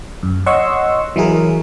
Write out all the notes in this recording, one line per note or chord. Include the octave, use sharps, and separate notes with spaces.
F#2
C#5 D#5 F#5 C6 C#6 E6
E3 F#3 E4 G#4 A#4